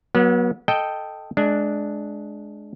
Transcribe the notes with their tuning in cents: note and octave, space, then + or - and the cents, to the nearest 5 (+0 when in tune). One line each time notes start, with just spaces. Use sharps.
F#3 +0 B3 -40
A4 +0 D#5 +0 G5 +0
G#3 +20 D4 +0